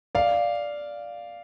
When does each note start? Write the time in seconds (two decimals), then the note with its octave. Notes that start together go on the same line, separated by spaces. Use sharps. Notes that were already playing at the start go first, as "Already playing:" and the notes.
0.15 D5 F5